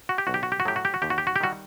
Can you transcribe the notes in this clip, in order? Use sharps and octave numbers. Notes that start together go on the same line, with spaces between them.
F#4
G4
B1 F#4
G4
F#4
G4
F#4
A2 F#3 G4
F#4
G4
F#4
D#2 G4
F#4
G4
F#4
G4
D#3 G3 F#4